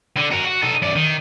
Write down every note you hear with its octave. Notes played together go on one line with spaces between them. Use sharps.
D3
F#4 A#4
F#4
D#4 A4
F#2 D5
D#3